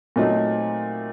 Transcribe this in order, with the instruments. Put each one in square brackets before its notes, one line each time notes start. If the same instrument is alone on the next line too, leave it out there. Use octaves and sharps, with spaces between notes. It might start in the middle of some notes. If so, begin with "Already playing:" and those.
[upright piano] A#2 F#3 A3 C4 D#4